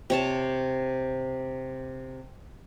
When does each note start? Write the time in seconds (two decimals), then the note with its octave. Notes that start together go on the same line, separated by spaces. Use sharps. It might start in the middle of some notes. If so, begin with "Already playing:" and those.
0.10 C3 C#5 A5